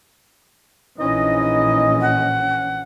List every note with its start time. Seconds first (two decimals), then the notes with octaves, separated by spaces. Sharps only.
0.99 A#1 E3 C#4 D#4 E4 D#5
2.01 F#5